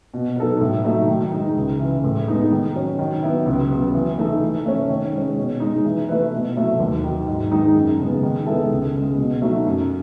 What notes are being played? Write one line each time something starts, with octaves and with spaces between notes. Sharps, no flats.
B2
F#3 B3 D#4 A4
A2
F#3 A3 D#4
D#3
G#3 D#4
C#2
C#3 E3
A2
G#3 B3 D#4 G#4
D#3
F#3 C#4
D#3
F#3 B3 E4
C#2
C#3 F#3 B3
E3
A3 D#4 A4
E3
A3 C#4
D#3
G#3 C#4
B2
G#3 D#4
E3
A3 E4 B4
B2
F#3 A3 E4
D#2
D#3 F#3
G#2
D#3 G#3 D#4
F#2
C#3 G#3 B3
D#3
G#3 B3 E4 A4
C#2
C#3 G#3
B2
F#3 A3 D#4 F#4
F#2